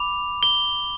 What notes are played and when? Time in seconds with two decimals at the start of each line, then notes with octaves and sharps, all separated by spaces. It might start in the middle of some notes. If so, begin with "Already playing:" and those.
Already playing: B5 D6 F7
0.43 G7